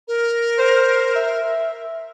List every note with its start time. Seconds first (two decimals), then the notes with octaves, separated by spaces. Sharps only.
0.08 A#4
0.59 C5
1.15 E5